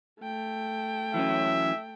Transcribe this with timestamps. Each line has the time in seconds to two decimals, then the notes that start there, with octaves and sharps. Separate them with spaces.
0.21 A3 G5
1.14 E3 F#3 C#4 E5